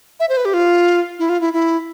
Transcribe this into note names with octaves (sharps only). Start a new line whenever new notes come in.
E5
C5
B4
G4
F4
E4
F4
E4
E4